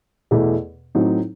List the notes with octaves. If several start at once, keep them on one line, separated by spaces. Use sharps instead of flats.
E2 B2 A3 E4
A2 F#3 C4 D#4